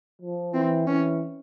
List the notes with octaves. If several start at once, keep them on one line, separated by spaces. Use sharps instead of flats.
F3
E3 C4
E3 C#4